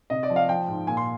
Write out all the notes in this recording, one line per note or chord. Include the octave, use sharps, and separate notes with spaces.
C3 D#5
D5
F3
F5
F3 G5
G#2
A#2 G#5
C6